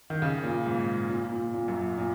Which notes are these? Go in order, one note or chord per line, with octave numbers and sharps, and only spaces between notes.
D#3
C#3
A#2
G#2
A#2
A#2
A#2
F#2
A#2